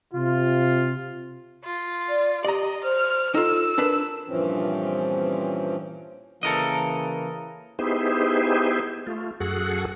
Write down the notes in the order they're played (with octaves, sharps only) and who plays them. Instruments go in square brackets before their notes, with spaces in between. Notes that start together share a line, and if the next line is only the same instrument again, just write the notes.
[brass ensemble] C3 F4
[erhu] F4
[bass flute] D5
[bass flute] G4 [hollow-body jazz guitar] D5 A#5 [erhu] D#5
[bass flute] C5 [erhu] F6
[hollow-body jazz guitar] D#4 F4 [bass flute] A4 [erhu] E6
[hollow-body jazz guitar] D4 G#4 B4 [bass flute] A#4
[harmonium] G2 A#2 E3 F3 C4 C#4
[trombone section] C#3 E3 A#3 [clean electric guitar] A4 A#4 D#5
[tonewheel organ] B3 D#4 E4 G4 G#4 C5
A3 F4
F#2 F#4 G#4 A4 F#5